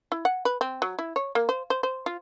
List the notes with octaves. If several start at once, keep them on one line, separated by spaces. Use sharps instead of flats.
E4
F#5
B4
C4
F#3
E4
C#5
A#3
C5
C5
C5
F4